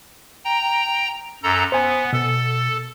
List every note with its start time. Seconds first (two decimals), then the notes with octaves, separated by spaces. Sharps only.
0.45 G5 A#5
1.43 F#2 A4 A#5
1.72 B3 C5 G#5
2.13 B2 A4